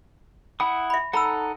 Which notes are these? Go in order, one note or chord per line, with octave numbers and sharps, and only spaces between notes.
E4 F#5 B5 D#6
E5 B5
D#4 A4 F#5 A#5 B5 E6